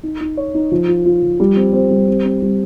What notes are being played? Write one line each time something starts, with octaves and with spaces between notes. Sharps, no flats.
D#4
D#4
C#5
D#4
F3
F4
F4
F3
G3
C4
C4
G3
C4
C4
G3